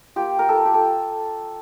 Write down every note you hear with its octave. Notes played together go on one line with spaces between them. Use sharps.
A#3 F4 G4
A#4
A4
G4
A4